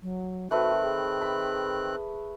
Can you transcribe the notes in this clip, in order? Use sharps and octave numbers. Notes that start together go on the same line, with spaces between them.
F#3
D#3 A3 C4 F#4 B4 F#6
G#4
B5